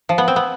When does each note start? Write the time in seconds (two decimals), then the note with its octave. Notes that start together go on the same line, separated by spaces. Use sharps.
0.09 F3
0.18 B3
0.28 C4
0.36 B3